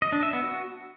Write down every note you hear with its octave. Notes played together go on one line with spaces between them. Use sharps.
D#5
D4
E5
B3
F#4